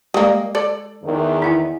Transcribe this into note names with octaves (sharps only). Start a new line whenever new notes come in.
G3 G#3 A#3 D#5
A4 D5
E2 D#3
E4 F#5 G#5